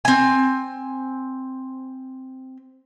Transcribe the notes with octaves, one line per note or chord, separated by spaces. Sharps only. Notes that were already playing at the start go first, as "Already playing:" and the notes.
C4 G#5